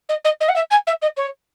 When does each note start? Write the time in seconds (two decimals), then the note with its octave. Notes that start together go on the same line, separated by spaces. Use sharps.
0.09 D#5
0.24 D#5
0.40 D#5
0.49 F#5
0.56 E5
0.71 G#5
0.87 E5
1.02 D#5
1.17 C#5